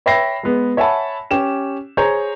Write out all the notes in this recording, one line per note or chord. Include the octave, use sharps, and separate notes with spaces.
C#5 E5 G5 B5 A#6 C7
G#3 B3
C#5 E5 F#5 G#5 A5 B5
C#4 G4 E7
G#4 C5 C#5 A#5 G6